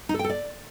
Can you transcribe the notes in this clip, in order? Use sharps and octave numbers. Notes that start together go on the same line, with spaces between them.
D#4
A4
G5
A4
D5